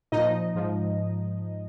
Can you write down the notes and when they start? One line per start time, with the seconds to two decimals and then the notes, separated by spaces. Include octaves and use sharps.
0.12 A#2 D#4 D#5
0.17 F3
0.55 G#2 F3